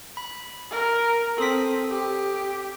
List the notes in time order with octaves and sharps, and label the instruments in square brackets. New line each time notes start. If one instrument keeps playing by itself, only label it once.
[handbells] B5
[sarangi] A#4
[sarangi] C4 [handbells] A4 D#6 B6
[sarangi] G4